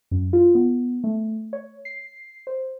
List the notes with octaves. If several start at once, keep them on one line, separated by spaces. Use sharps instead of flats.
F#2
F4
B3
A3
C#5
C7
C5